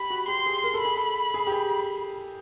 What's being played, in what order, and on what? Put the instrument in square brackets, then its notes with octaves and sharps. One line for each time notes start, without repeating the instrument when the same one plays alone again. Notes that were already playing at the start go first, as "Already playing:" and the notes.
Already playing: [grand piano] G4 [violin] B5
[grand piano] F#4
[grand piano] G4 [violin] C6
[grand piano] G#4
A#4
A4
[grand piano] G#4 [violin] B5
[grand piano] A4
G#4
G4
G#4